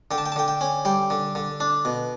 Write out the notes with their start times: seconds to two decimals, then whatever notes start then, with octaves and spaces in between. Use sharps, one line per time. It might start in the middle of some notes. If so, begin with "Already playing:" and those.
0.11 D3 G5
0.18 A5
0.26 G5
0.32 A5
0.36 D3 G5
0.48 G5
0.61 C#4
0.85 G3 G5
1.10 D3
1.35 D3
1.60 D4
1.85 B2